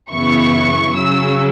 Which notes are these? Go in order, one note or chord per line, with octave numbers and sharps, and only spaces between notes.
F#2 C#3 E3 B3 E4 C#6
C#3 F#3 C#4 E6